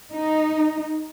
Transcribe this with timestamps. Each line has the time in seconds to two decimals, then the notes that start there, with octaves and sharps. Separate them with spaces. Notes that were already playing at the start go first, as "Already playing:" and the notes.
0.12 D#4